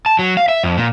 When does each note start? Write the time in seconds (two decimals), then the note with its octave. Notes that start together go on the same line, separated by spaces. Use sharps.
0.06 A5
0.19 F#3
0.37 F5
0.49 E5
0.64 F2
0.77 A#2